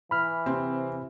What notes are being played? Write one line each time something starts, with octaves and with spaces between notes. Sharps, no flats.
E3 B5 F6
C3 C4